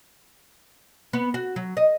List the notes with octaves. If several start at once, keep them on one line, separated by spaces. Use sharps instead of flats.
B3
F#4
F#3
D#5